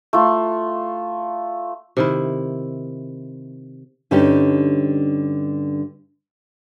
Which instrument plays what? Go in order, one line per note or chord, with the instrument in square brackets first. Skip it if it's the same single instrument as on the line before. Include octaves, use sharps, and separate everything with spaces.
[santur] A3 F4
[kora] C3 D#3 E4
[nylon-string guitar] G2 D3 C#4 D#4 G4